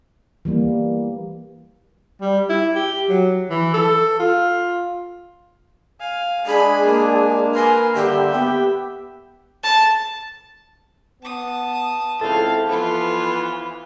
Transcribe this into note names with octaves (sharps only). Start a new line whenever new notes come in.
E3 G3 A#3
G3
E4
G4
F#3
E3
A4
F4
F5 G#5
G#3 D4 G#4 B5
A#3
A#4 B4 G#5 C6
G2 D3 G4 E5 G5
B3 G4
A5
B3 A5 D#6
C#2 C4 E4 A4 F5 A5
E3 F3 B3 F4